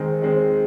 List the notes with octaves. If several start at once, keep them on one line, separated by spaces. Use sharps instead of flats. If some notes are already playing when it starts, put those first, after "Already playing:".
Already playing: D#3 G#3 C4
D#3 G#3 C4